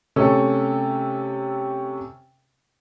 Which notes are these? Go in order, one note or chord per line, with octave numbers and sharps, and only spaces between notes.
C3 A3 C#4 A4